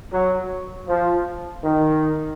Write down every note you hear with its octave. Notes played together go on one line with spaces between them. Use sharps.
F#3
F3
D#3